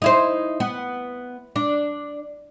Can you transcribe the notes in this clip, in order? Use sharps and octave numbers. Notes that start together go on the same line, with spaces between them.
D#4 E4 C5
B3
D4